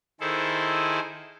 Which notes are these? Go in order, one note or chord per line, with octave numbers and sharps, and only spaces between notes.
D#3 E4 G#4 A4 C5